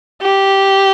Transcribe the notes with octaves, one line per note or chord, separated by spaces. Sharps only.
G4